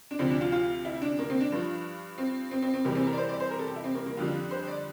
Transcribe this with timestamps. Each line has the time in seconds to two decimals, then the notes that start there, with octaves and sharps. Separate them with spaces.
0.11 D4
0.19 D2 C3 F3 C4
0.31 D4
0.41 F4
0.52 F4
0.85 E4
1.02 D4
1.19 A#3
1.30 C4
1.41 D4
1.52 G2 F3
2.18 C4
2.51 C4
2.62 C4
2.74 C4
2.85 E2 C3 E3 G3 A#3
2.95 C4
3.07 A#4
3.13 D5
3.17 C5
3.29 D5
3.40 C5
3.51 A#4
3.59 A4
3.68 G4
3.76 E4
3.84 C4
3.95 A#3
4.06 A#3
4.17 F2 D3 G3 F4
4.51 C5
4.68 D5